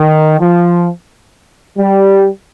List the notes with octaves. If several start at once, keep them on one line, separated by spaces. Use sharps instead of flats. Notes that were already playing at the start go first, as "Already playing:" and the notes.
Already playing: D#3
F3
G3